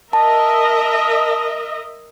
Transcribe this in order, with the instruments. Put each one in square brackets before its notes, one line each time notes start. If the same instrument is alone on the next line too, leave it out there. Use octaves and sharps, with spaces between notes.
[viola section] A#4 D#5 E5 [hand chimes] A5